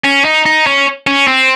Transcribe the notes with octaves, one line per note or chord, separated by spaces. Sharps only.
C#4
D#4
D#4
C#4
C#4
C4